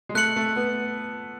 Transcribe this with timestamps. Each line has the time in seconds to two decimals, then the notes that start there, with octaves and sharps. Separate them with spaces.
0.09 G#3
0.15 A3 F#6 C#7 F#7
0.36 A3
0.56 B3